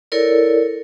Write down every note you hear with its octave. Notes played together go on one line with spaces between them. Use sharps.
E4 A4 A#4 C#5 D5